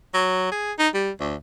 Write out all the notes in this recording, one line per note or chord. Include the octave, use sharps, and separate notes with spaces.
F#3
G#4
D#4
G3
D2